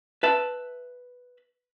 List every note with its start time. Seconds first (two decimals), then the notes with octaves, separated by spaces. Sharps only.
0.23 B4 E5 A5